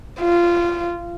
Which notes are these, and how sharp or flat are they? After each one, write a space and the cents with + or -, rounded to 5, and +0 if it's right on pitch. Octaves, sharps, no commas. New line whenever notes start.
F4 -15